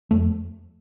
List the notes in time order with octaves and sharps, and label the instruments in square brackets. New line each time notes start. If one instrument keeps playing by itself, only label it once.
[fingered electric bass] F2 A3